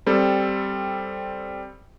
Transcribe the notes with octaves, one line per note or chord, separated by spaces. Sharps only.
G3 C4 A4